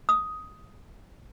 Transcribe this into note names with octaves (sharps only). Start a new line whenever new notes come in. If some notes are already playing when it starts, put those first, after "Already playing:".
D#6